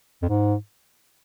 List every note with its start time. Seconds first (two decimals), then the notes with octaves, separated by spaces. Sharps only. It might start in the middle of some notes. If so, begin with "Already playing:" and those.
0.22 F2
0.29 G#2